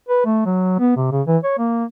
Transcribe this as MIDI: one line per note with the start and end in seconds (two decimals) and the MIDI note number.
0.09 0.22 71
0.25 0.44 57
0.46 0.74 54
0.79 0.93 59
0.96 1.11 48
1.12 1.22 49
1.27 1.37 52
1.43 1.56 73
1.58 1.85 58